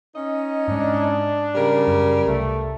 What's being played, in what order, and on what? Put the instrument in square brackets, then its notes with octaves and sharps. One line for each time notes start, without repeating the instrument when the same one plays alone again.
[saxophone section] C#4 D#4 D#5
[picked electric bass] G#2 G#3 [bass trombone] D4
[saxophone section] C#3 G3 A#4
[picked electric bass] F#2
[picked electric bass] C2 [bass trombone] A3